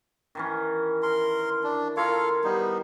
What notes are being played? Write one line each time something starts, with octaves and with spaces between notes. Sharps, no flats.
D#3 E3 C#4
A#4 C6
D4
F4 A4 A#4 C#5 F5
G3 B3 D#4 C5